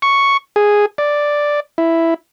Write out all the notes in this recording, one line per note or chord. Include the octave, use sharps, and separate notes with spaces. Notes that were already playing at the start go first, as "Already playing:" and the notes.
C#6
G#4
D5
E4